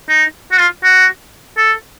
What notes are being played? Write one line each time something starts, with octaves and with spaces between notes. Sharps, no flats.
D#4
F#4
F4
F#4
A4